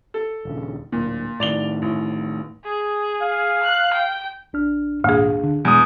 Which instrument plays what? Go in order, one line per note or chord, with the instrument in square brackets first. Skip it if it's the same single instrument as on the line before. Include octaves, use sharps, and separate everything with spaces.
[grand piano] A4
[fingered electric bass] D#1 C#3
[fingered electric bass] D1 [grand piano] A#2
[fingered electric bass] A2 D#3 [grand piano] D5 F7 G7
[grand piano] A1
[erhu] G#4
[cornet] F5
[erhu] F#6
G5
[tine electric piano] A#1 D4 F6
[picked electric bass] G#1 A#2 [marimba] D2 G#4 [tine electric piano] F5
[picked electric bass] D3
[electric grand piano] E2 D#6 [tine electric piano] B2 [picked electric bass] G3 G#3